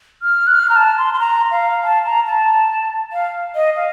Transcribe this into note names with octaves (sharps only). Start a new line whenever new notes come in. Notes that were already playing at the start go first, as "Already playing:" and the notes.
F6
F#6
F6
A#5
A5
C6
C6
A#5
F5
A5
A#5
A5
F5
D#5
F5